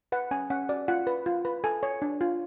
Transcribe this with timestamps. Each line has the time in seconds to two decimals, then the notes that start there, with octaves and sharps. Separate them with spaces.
0.12 B4 F#5
0.31 C#4 G#5
0.50 C#4 F#5
0.69 F#4 D5
0.88 F4 F#5
1.07 B4
1.26 F4
1.45 B4
1.64 A4 G#5
1.83 C#5
2.02 D4
2.21 F4